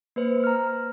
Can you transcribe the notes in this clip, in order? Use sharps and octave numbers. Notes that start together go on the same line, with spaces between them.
A#3 B4 C5
A#5 F6